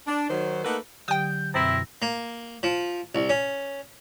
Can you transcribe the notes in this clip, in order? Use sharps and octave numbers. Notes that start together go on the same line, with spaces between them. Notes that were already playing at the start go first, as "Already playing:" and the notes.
D4
D#3 F#3 C5
A3 A#3 D#4 A4 B4 F#5
D3 F#3 G4 G5 D#6 G6
F#2 B2 C4 E4 A#6
A#3
F3
C2
C#4